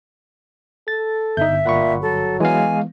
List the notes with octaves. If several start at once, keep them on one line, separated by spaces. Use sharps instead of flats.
A4 A6
G1 D#4 E5 G6
A#2 F#5 B5 C#6
F#3 A4
E3 G#3 B3 F5 G#5